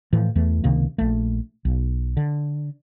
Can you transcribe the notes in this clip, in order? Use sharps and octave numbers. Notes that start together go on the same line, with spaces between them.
A2 E3 F3
E2 E3 A3
C#2 C3 D#3 A#3
A#1 A3
B1
D3